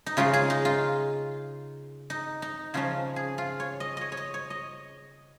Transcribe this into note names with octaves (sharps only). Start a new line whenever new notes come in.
D#4
C#3 G#3 C#4 F4
G#4
D#4
F4
D#4
D#4
C#3 F3 C#4 F4
G#4
F4
C#5
D#5
C#5 D#5
C#5
D#5
C#5
D#5